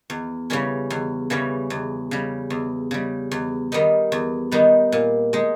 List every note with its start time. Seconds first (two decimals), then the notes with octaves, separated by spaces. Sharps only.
0.10 E2
0.50 C#3 E3 G3 C#4
0.90 E2
1.30 C#3 E3 G3 C#4
1.70 E2
2.11 C#3 G3
2.50 E2
2.91 C#3 G3
3.31 E2
3.72 D#3 G3 B3 D#4
4.12 E2
4.51 D#3 G3 B3 D#4
4.92 A#2
5.33 G#3 D#4